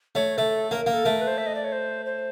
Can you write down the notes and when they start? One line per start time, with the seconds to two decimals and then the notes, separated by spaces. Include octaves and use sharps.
0.15 A3 C#5
0.38 A3 A4
0.71 A#3 A#4
0.86 A#3
0.94 A4
1.05 A3 A#4
1.21 B4
1.27 C5
1.38 E5
1.46 D#5
1.55 D5
1.64 C#5
1.72 C5
2.06 C5